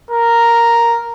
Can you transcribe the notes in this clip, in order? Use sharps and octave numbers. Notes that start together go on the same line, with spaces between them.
A#4